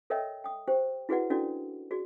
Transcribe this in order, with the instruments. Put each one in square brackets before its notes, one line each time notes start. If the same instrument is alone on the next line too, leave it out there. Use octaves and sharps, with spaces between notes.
[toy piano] A4 A#4 C#5 D#5 E5 G5
G5 D#6
G4 C5 G5
E4 F#4 G#4 B4 D5 F#5
C#4 D4 E4 F#4 A4 D5
F#4 G#4 D5